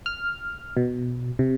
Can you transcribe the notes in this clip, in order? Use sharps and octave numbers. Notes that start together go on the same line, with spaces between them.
F6
B2
C3